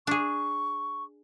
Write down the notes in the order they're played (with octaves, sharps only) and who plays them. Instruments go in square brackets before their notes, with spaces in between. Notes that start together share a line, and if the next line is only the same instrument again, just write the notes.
[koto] D4 G#4 [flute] C#6